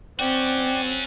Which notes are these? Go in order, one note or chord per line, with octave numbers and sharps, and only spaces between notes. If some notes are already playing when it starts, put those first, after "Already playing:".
C4 C#4 F#4 D5 G5 F#6